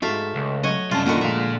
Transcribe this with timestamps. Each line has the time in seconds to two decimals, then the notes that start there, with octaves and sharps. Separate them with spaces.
0.02 F2 G#2 A3 F#4 E5 F5
0.35 C#2
0.63 F#3 F#4 C#5 D#5
0.91 F#2 C3 G3 C#4 F4 A5
1.06 D3 D#3 A#3 F4 F#4
1.21 A#2 F3 G#3 E5 F5